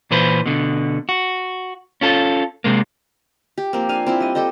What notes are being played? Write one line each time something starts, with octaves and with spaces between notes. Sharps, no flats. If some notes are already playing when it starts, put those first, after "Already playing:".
A#2 E3 B4 C5
B2 D3
F#4
C#4 F4 A4
C3 G#3 A#3
G4
F3 A#3 C4
D4 F5 G#5
C4 E4 F4
G3 D#5
G4 A4 C5 D#5